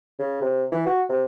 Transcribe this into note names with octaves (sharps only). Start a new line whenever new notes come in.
C#3
C3
E3
F#4
C3